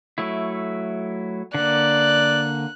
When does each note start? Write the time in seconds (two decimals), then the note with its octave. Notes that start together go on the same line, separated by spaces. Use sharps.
0.18 F#3 A3 E4
1.54 D3 A#3 D5 F#6